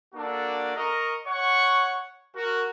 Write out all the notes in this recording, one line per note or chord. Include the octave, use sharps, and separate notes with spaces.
A#3 D4 F#4 A4
A#4 D#5 A#5 C#6
C#5 F#5 C#6
F#4 A#4